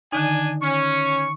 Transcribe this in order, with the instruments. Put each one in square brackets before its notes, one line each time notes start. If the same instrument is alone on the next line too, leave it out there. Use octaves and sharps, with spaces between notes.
[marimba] D3 D#3 D#4 [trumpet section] D4 G#5
[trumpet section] C#4 [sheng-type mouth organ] C#6